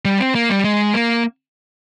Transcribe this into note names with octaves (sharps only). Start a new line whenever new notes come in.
G3
C4
A#3
G3
G#3
A#3